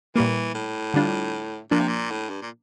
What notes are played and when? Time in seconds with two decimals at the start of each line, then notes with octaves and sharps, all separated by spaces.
0.16 A#2 E3 G3 A#3
0.55 A2
0.94 D3 G3 D4 F4
1.71 A#2 F3 A#3 D4
1.80 C3
1.88 A#2
2.11 A2
2.30 G2
2.42 A#2